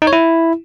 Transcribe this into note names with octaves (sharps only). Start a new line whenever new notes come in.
D#4
C#5
E4